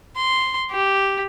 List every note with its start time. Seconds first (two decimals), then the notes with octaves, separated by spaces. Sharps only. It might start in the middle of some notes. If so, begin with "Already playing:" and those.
0.16 C6
0.71 G4